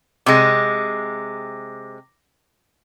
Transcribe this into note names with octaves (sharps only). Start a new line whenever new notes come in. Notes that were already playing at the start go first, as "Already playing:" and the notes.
C3 G#3 D6 A#6